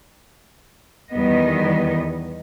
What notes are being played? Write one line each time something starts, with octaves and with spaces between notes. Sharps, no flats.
E2 D#3 G3 B3 D#5